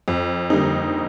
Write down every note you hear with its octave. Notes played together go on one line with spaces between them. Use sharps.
F2
D3 G3 A#3 D#4